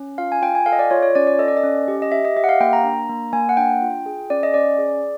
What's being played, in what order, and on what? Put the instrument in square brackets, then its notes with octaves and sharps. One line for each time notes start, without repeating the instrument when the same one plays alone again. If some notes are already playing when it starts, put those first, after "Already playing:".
Already playing: [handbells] C#4
F4 F5
G#5
F4 G5
G#5
A4 F5
D#5
D5
F4 C#5
C#5
C#4 D5
D5
A4 D#5
D5
D#5
C#4
G4
D#5
G4 E5
D#5
G4 E5
F#5
F5
A#3 G5
A#5
D4
A#3
A#3 G#5
F#5
D4 G5
F4
G#4
C#4 D5
D#5
C#4 D5
G#4